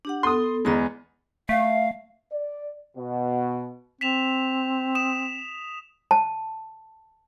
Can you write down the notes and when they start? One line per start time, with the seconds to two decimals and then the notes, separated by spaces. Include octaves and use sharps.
0.05 D4 G4 F#5
0.23 B3 A4 C6 D#6
0.65 E2 G#3 D#5 A#5 B5
1.49 A3 F5
2.32 D5
2.97 B2
4.01 C4 B6 E7 F7
4.95 D#6 E7
6.11 A5